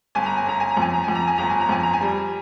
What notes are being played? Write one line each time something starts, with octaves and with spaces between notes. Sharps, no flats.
G1 G#5
A#5
G#5
G1 A#5
G#5
A#5
F2 G#5
A#5
F2 G#5
A#5
G#5
G1 A#5
G#5
A#5
F2 G#5
A#5
G#5
G3